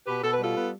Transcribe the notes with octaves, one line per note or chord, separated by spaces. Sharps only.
B2 G4 B4
B2 A4
B4
G3 F4 A4
B3